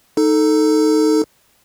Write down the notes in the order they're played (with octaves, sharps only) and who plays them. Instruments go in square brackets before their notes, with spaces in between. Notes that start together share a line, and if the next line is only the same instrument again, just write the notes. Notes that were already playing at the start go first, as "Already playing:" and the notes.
[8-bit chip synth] D#4 A4